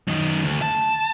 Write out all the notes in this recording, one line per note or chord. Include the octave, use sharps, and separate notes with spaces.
F#2 D#3
D2
A5